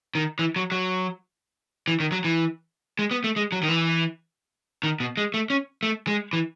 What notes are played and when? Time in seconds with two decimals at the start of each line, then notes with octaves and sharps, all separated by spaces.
0.15 D#3
0.39 E3
0.56 F#3
0.72 F#3
1.88 E3
2.00 D#3
2.12 F#3
2.25 E3
2.99 G#3
3.11 B3
3.24 A3
3.36 G#3
3.52 F#3
3.63 D#3
3.69 E3
4.83 D#3
5.00 B2
5.17 G#3
5.34 A3
5.50 C#4
5.83 A3
6.07 G#3
6.33 E3